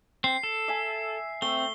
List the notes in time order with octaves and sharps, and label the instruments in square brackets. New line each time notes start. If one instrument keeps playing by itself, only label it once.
[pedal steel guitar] C4 [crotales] C7
[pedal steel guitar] A4
[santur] E5 G#5
[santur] A3 [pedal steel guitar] C4 [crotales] G7